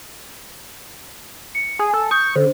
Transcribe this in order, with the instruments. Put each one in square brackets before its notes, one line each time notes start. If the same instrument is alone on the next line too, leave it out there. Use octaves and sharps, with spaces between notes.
[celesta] C#7
[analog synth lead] G#4 [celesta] G#5
[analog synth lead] A4
[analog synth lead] C#6 [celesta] D#6 G6
[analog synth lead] D3 [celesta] C5